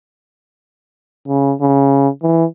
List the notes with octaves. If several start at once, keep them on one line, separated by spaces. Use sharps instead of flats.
C#3
C#3
E3